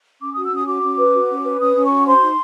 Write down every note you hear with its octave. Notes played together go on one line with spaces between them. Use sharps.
C#4 D6
F#4 D#6
E6
C#4 D#6
F#4 D6
C#4
B4
F#4
C#4
B4
C#4 D#6
C#4
C#6
F#4
C5 C6
D#4